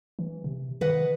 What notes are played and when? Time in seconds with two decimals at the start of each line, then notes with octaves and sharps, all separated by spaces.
0.19 E3
0.44 C3
0.81 D#3 B4 D#5 F#5